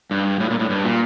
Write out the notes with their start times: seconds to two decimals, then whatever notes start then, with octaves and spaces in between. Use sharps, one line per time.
0.11 G2
0.40 A2
0.50 A#2
0.60 A2
0.70 G2
0.85 A#2